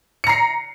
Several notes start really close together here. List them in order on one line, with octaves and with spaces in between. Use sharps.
C#7 A#5 C7